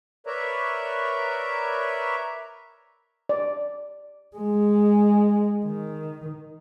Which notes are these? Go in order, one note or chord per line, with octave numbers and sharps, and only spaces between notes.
A#4 B4 C#5 D5 E5 A#5
D5
G#3
D#3